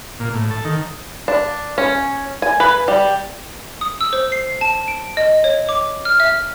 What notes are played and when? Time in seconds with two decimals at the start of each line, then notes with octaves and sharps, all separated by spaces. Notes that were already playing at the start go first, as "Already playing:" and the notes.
0.20 A#2
0.35 A2
0.51 A4
0.65 D#3
1.28 D4
1.78 C#4
2.42 G#5
2.60 B4
2.88 G3
3.81 D#6
4.01 E6
4.13 C5
4.32 C7
4.61 A5
4.88 D7
5.17 D#5
5.44 C#5
5.69 D6
6.05 F6
6.20 E5